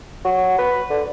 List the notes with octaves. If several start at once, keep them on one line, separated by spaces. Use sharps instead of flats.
F#3
B4
D3